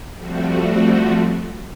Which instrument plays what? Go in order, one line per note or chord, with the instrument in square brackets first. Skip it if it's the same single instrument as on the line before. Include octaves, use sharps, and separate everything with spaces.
[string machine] F3 G3 A3 C4 F#4